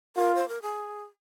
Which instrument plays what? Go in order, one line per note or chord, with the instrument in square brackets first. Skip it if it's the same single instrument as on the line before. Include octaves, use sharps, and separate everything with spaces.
[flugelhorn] F4 [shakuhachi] A#4
[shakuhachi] C5
A#4
G#4